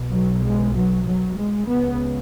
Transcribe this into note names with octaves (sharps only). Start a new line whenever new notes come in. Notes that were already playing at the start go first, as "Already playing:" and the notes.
Already playing: B1 B2
F#3
G#3
F#3
F#3
G#3
C#2 C#3 B3